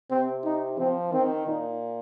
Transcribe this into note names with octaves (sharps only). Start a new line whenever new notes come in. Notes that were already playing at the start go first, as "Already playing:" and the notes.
C3 C4
D#4
F3 C4
D#3 C4
A#2 D#4